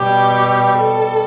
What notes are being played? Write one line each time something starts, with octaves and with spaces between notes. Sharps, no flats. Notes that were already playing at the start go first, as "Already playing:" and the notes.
Already playing: B2 G3 G4
A4